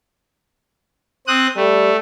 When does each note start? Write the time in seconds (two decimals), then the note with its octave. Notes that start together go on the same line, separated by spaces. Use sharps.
1.27 C4 D#6 F#6
1.56 G3 A3